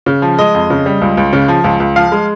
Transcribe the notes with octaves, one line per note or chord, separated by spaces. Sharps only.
C#3
F3
G#3 D#5
F2
C#3
G3
C#2
C#2
C#3
F3
C#2
C#2
F3 F5
G#3